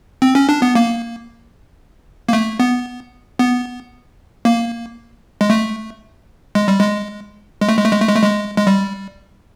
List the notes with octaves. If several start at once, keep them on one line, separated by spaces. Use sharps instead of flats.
C4
C#4
D4
B3
A#3
A#3
A3
B3
B3
A#3
G#3
A3
G#3
G3
G#3
G#3
A3
G#3
A3
G#3
A3
G#3
A3
G#3
G#3
G3